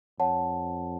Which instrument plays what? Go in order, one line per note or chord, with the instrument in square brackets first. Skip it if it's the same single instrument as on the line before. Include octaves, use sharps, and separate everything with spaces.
[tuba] F2 [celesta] C#5 F#5 A5